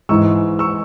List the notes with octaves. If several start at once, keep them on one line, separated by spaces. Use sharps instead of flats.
G#2 E3 G#3 C#6 E6
C#6 E6